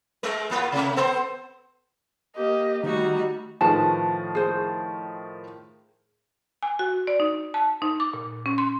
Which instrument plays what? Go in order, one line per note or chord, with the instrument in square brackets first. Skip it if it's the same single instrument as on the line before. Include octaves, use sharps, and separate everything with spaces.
[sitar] G#3 A3 A#4
A2 A#3 F4
C3 A3
B3 A4 C5
[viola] A#3 G4 [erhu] D#5
[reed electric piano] D#3 [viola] G3 [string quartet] A3 F#4 [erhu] D#4
[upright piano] A2 D#3 F3 [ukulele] G#4 B4 A5
[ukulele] G#4 C5
[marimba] G#5
F#4
D5
D#4
A5
D#4
D6
A#2
C#4
C6